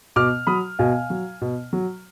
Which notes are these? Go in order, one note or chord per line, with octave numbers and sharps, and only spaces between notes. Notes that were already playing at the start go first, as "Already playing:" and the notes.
B2 D6 F6
F#3 B5 D#6
B2 F5 G#5
F#3
B2
F#3